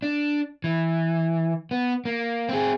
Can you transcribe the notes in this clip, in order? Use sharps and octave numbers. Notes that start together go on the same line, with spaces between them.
D4
E3
B3
A#3
C4 G#4